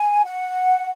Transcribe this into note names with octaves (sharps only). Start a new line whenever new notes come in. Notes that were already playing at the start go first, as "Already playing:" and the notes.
Already playing: G#5
F#5